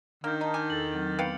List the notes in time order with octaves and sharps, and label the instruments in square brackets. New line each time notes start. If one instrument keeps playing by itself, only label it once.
[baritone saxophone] D#3 [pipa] A#3 [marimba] D4 [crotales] F6 G6
[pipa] D#4 [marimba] A5 D#6
[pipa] G#5 [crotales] D6
[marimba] E2 A4 E6 [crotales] A6 F#7
[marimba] F#3 C4
[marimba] B3 [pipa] B4 F5 G5 [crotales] G6 C#7 F7